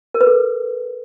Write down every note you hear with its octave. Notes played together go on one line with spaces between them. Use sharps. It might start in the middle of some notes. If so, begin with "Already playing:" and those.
A#4
B4
A4